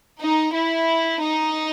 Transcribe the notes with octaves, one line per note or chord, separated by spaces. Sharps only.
D#4
E4
D#4